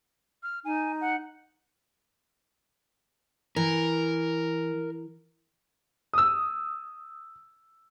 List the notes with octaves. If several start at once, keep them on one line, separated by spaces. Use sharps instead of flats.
F6
D#4 G#5
F#5
E3 A#4
D#6 E6